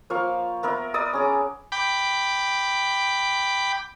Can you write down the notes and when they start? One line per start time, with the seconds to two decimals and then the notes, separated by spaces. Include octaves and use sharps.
0.10 F3 A#3 F5 C#6
0.63 B3 A#4 E5
0.94 D5 D#6 E6
1.13 C#4 G#4 D6
1.72 G5 B5 D6